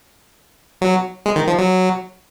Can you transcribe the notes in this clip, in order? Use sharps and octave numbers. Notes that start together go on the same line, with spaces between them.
F#3
G#3
D#3
F3
F#3